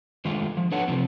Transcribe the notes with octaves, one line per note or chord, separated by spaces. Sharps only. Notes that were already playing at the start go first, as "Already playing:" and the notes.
D3 D#3 G#3 A3 F4
F3
D4 A4 B4 C#5 F#5
C3 F3 C4